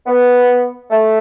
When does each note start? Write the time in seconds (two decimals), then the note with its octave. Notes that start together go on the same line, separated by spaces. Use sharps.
0.07 B3
0.91 A3